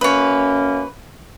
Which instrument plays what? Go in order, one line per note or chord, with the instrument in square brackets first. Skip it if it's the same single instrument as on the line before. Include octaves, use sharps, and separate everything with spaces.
[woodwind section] F#2 A#3 C#4 [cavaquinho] B4 C#5